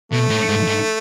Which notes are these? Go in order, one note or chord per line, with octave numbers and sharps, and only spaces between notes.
B2 A3
A2
G#2
G#2